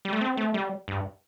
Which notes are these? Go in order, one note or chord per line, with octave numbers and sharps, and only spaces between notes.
G3
A3
C4
A3
G3
G2